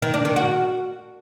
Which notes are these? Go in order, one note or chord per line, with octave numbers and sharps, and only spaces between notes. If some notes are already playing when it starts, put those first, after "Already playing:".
D#3
D4
D#3
F#4